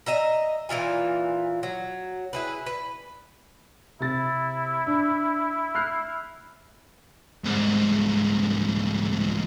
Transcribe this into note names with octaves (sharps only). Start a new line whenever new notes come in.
D#5 E5 A#5
A#2 E3 F4 G#5
F#3
E4 G#4 B4
B4
C3 E4 A6
D4
F6 F#6 C7
C2 G#2